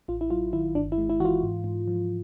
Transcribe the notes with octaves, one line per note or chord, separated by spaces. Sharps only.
A1 F4
E4
F#3 F4
D#3 E4
G1 D4
E4
G#3
E4
E3 F4 F#4
G#2
G#2
F3